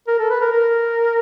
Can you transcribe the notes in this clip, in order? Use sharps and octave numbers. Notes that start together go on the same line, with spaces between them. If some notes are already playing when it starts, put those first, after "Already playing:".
A#4
A4
B4
A#4
A#4